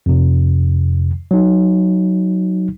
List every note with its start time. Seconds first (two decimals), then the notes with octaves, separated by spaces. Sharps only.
0.06 F2 C3
1.31 F#3 D#4